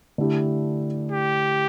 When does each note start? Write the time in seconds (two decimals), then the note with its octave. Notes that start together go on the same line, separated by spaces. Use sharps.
0.18 D3 A3 E4 G4
1.12 G4